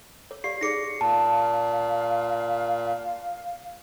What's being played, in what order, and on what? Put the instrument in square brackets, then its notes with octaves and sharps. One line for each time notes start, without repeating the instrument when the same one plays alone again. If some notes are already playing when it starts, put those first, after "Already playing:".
[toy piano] C#5
[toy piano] G4 D5 F5 [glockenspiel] C7
[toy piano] D#4 G#4 D5 [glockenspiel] A#6 C#7
[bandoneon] A#2 [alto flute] F5 [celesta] A5